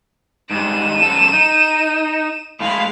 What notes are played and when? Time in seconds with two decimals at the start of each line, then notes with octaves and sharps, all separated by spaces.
0.51 G#2 G3 D#7 E7
1.02 F#2 A4
1.33 D#4
2.61 A2 G#3 E4 F5